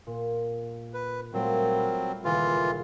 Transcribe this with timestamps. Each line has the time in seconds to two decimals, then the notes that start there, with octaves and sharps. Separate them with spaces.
0.07 A#2
0.94 B4
1.33 A#2 F#3 G3 A3 C4
1.76 B5 F6
2.24 D#1 C#2 E3 F4 A4